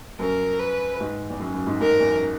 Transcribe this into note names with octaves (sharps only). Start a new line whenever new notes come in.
F#2 A#4
B4
G#2
E2
F#2
F#2
G#2
G#2 A#4
F#2
E2
F#2